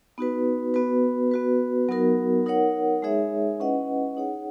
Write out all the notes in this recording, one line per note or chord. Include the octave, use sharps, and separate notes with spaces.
B3 D#4 F#4 B4
B3 F#4 B4
B3 F#4 B4
F#3 B3 D#4 F#4 A#4
D#4 A#4 C#5 F#5
G#3 D#4 G#4 C#5 E5
C#4 E4 B4 D#5 F#5
D#4 G#4 C#5 F#5